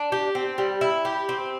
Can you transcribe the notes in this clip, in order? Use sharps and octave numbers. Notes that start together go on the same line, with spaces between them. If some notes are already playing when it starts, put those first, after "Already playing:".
Already playing: D4
G4
C4
G3
E4
G4
C4